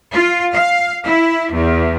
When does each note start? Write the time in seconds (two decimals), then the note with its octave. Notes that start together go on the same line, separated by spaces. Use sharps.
0.12 F4
0.53 F5
1.05 E4
1.52 E2